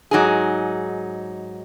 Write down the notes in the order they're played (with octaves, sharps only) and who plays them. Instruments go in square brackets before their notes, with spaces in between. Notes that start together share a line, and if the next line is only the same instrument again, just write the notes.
[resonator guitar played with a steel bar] G#2 F#3 D#4 G#4